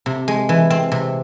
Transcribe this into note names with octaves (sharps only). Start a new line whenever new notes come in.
C3
G#3
E3
C4
C3